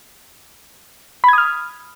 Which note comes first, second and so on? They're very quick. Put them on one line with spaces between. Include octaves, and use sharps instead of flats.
B5 G#6 D#6 F6